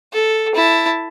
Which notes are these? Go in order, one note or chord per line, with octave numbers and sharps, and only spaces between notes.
A4
E4 A5